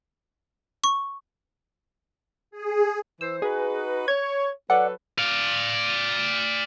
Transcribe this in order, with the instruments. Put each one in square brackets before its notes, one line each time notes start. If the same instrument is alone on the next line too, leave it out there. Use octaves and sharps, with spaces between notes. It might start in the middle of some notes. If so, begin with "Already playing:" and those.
[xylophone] C#6
[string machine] G#4
[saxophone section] E3 C5 [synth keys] E6
[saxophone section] D#4 F#4 B4 [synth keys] G#4
[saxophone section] C#5 [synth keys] G#6
[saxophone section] F#3 A4 B4 [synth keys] D5 F#5
[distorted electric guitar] D5 F5